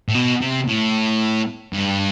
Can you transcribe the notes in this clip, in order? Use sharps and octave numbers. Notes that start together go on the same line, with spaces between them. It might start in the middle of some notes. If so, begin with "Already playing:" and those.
A2
B2
C3
A2
G2